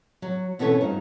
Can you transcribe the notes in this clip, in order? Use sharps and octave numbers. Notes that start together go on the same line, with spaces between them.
F#3
B2 E3 B3 C#4 A4 C#5
G2 F3 D#4